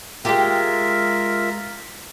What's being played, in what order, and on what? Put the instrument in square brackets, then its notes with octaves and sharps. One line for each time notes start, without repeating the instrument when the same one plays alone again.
[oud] G#3 G4 [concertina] F4 A#4 E5